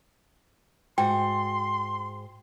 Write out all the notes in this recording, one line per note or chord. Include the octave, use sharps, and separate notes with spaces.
G#2 F#4 G5 C6